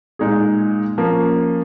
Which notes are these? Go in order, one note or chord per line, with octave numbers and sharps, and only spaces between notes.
A#2 G#3 D#4 G#4
F3 A#3 C#4